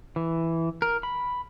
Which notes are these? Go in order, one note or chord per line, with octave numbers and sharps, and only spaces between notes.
E3
A#4
B5